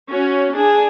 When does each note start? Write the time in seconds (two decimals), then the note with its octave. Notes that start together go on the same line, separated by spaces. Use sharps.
0.11 C#4 F#4
0.56 D4 G#4